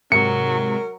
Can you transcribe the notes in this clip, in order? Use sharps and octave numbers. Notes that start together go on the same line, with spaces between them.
G#2 C3 F#3 A#4 C#7